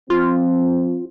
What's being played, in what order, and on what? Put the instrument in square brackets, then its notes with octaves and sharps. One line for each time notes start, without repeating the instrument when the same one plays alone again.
[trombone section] F3 C4 [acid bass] F4